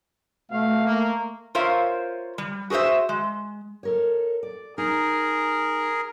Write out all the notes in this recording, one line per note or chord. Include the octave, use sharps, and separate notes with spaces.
B2 A3 F5
A#3
F4 A#4 C5 C#5 E5 F5
G3
F#4 G#4 B4 C5 E5
G#3
A4 A#4 C#5
D5
D#4 G#4 A#4